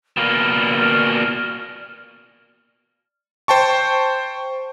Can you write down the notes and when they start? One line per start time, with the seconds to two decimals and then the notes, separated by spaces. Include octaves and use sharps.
0.17 B2 A#3 D5 F6
3.48 C5 G5 A5 C#6